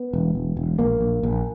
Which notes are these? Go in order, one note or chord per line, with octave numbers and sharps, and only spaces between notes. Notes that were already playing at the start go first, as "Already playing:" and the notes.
Already playing: B3
E1
E1
E1
A#1 A#3
A#1
A#1